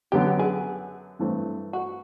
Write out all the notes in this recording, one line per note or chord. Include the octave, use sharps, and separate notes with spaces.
F#2 D3 F#3 B3 G4
G#4
G2 E3 A3 C4
F#4